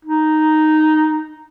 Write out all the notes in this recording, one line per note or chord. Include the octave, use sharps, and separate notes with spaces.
D#4